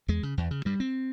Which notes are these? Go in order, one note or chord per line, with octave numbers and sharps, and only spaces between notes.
E2 G#3
C#3
E2
C#3
G2 G3
C4